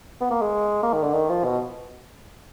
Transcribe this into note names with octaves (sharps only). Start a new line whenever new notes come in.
B3
A#3
G#3
A#3
D#3
D3
D#3
F3
B2